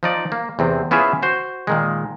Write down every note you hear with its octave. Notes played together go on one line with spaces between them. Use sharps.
F3 D#4 D5
A#3
E2 C3 C4
B3 C#4 E4 F4 G#4 E5
F#4 C5
A#2 D#3 G#3